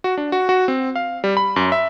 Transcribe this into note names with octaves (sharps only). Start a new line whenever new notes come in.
F#4
D4
F#4
F#4
C4
F5
G3
B5
F#2
E5